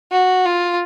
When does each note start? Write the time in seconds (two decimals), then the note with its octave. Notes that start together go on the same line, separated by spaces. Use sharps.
0.12 F#4
0.45 F4